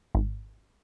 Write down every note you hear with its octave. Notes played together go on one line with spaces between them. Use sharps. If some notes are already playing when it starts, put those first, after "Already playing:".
G#1